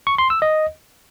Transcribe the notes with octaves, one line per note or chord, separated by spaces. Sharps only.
C#6
C6
E6
D#5